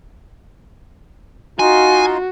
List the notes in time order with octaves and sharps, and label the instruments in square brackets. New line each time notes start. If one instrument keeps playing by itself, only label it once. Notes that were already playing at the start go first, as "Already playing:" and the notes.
[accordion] D#4 F4 C6 [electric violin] F#4 [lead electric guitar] G#5